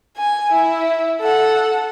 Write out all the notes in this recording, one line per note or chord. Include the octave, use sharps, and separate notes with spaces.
G#5
E4
A4 F#5